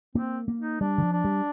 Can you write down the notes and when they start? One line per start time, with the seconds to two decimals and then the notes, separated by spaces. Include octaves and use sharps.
0.15 A#3 C4
0.48 A#3
0.58 D#4
0.81 G3 D4
0.98 D#3
1.02 F3
1.13 D4
1.25 G3